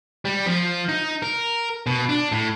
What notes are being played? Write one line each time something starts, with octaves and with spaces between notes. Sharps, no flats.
G3
F3
D#4
A#4
B2
D4
A2